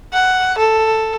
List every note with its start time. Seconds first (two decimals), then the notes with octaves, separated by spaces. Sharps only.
0.13 F#5
0.58 A4